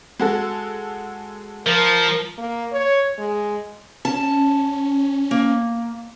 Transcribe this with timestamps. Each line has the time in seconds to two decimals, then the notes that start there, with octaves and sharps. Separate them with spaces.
0.20 G#3 F#4 A4
1.66 F3 A#4
2.38 A#3
2.72 C#5
3.18 G#3
4.05 C#4 A5
5.31 A#3